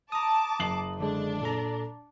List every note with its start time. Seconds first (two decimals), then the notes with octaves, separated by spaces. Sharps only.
0.12 A5 A#5 D6 D#6
0.59 F#1 C7 F#7
1.00 D3 G#3 D4
1.41 A#2 A4 A#5